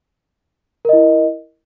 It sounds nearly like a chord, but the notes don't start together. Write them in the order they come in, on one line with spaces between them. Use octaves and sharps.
A#4 D#5 E4